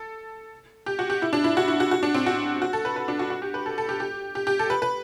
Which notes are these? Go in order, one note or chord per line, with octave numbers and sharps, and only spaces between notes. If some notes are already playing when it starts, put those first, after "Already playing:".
Already playing: A4
G4
F#4
G4
E4
D4
E4
F#4
E4
F#4
F#4
D4
C4
F#4
F#4
A4
B4
B4
D4
F#4
F#4
G4
B4
A4
A4
G4
G4
G4
G4
A4
B4
B4